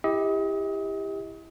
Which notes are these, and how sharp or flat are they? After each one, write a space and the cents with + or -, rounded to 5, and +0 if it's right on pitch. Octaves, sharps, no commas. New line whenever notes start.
E4 +0 G4 +25 D#5 +35